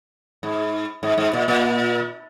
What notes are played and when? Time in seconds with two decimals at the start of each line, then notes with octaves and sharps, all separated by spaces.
0.43 G#2
1.03 G#2
1.18 G#2
1.33 A#2
1.48 A#2